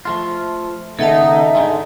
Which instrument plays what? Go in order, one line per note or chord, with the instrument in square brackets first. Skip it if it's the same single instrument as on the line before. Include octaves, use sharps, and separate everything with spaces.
[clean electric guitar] F3 A3 F4
[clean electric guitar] D#2 C#3 B3 [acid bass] D#4 [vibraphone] A4 D#5 A5 [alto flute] E5
[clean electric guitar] G#2 D3 G#3